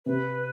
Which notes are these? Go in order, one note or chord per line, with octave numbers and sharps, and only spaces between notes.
C3 B4